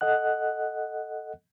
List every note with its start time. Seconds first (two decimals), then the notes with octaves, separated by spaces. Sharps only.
0.01 A4 D#5 F#5 F#6